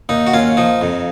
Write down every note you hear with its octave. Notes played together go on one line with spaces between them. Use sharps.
D#2 D#4
F#4
D#2 C#4 F4
F3 D#4
F2